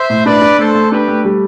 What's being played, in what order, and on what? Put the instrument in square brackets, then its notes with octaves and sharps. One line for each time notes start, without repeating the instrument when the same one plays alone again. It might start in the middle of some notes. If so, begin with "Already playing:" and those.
Already playing: [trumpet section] C5 E5
[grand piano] A2
[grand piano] D4 [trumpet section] B4 D5
[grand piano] D4
[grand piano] A3 [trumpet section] A4 C5
[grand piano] A3
[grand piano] D4 [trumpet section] G4 B4
[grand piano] A3
G3